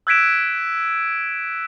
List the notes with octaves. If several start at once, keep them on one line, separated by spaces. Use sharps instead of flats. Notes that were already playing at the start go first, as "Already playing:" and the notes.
E6 F#6 G#6 B6 D7 E7